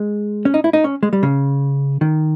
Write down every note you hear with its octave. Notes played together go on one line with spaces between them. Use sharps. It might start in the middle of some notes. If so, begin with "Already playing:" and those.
Already playing: G#3
C#4
D#4
E4
D#4
C#4
G#3
G3
C#3
D#3